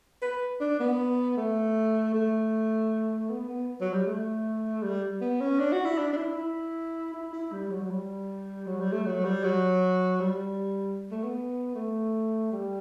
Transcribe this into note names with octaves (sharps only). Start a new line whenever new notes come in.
B4
D4
B3
A3
A3
B3
B3
F#3
G3
A3
G3
B3
C#4
D4
F#4
E4
D4
D4
E4
E4
E4
E4
G3
F#3
F#3
G3
F#3
G3
A3
F#3
G3
F#3
G3
A3
B3
A3
G3